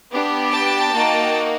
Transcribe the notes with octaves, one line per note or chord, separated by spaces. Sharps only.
B3 D4 G4
G5 A5
A#3 D#4 F#4